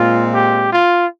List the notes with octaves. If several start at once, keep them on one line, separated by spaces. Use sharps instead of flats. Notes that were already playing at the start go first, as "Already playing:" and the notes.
Already playing: A#2 G#3 C4 F4
G4
F4